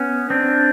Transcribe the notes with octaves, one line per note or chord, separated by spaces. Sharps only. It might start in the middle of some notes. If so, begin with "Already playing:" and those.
Already playing: B3 C#4
C4 D4